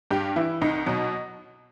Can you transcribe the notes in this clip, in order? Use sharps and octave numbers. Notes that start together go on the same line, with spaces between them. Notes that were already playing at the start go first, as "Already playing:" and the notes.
G2 G4
E3 E4
C2 D#4
B2 F#3